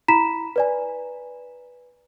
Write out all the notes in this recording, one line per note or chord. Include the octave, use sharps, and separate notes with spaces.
E4 A#5 B5 B6 E7
B4 D5 G#5